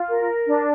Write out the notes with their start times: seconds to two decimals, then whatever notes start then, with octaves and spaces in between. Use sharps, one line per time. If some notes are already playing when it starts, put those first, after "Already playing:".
Already playing: F4
0.09 A#4
0.46 D4